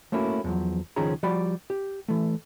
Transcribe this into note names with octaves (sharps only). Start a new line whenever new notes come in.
A3 A#3 C#4 E4 F#4
E2 F3 F#3
C#2 D#3 F3 C#4 G#4 A#5
F3 G3 F#4 D5 B5
G4
E3 A3